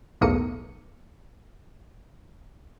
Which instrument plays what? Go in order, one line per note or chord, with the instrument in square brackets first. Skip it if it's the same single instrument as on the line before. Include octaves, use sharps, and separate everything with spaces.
[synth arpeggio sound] B1 E2 A2 A#3 D#6 C#7